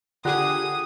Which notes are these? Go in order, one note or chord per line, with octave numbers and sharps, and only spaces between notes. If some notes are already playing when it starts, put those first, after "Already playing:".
D3 F4 G4 G#4 F#5 D#6 F#6